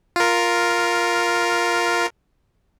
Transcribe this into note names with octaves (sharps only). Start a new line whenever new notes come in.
F4 A#4